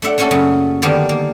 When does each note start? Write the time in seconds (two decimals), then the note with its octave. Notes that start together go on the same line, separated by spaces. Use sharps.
0.02 A3 D4 E5 F#5
0.18 A3 A#3 C#4 F#4 A4
0.31 F#2 C#3 C#4
0.82 D3 D#3 G3 A#3 B3 D4
1.09 A#3